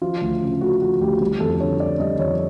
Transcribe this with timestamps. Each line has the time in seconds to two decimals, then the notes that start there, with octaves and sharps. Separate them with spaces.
0.02 F3 F4
0.21 D2
0.42 C#3
0.61 A3 F#4
0.81 F3 F#4
1.01 D2 G4
1.21 G3
1.40 F2 A4
1.60 D3 C#5
1.80 C4 D5
2.00 G3 D#5
2.19 F2 C#5